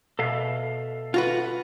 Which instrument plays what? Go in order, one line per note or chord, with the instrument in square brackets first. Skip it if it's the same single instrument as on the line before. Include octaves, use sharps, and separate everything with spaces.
[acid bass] B2 [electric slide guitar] A4 E5 F5
[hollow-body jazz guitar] F4 F#4 B4